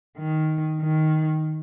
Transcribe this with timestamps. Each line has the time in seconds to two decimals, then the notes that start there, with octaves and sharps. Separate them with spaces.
0.18 D#3
0.81 D#3